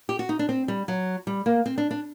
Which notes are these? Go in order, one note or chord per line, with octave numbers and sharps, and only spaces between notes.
G4
F#4
D#4
D4
C4
G3
F#3
G3
A#3
C4
D4
D4